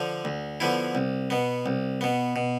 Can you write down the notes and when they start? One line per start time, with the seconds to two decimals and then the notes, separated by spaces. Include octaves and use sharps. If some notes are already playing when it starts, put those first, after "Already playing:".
Already playing: D3 F3
0.25 D2
0.60 D3 F3 B3 E4
0.95 C2
1.30 B2 B3
1.66 C2
2.01 B2 B3
2.36 B2